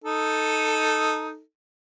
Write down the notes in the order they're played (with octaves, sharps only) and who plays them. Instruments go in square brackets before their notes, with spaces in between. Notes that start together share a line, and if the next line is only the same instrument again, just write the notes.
[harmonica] D#4 A4